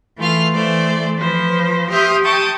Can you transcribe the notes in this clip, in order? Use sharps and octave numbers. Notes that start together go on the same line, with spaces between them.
E3 A3 F4 F5
E3 A3 C5 D5
F3 B4 C5
G4 E5 C6 D#6 F6 G6
G5 A5 C#6 D#6 G6